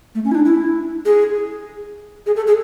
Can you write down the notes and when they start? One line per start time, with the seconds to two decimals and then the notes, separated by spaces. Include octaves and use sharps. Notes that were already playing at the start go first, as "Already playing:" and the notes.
0.15 A3
0.25 C#4
0.31 E4
0.35 D4
0.46 E4
1.05 G#4
2.26 G#4
2.36 A4
2.47 G#4